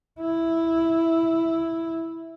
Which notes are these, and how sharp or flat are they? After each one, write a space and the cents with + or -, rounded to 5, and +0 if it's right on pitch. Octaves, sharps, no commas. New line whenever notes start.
E4 +0